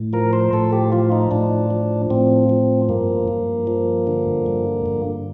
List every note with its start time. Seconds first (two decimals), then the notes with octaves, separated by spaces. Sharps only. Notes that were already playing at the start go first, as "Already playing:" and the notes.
Already playing: A2
0.13 F3 A#4
0.33 C5
0.53 A2 A4
0.73 G4
0.92 F3 F4
1.12 D#4
1.31 A2 D4
1.71 F3
2.10 A2 C4
2.49 F3
2.89 G2 A#3
3.28 G2
3.67 F3
4.07 D3
4.46 G2
4.86 G2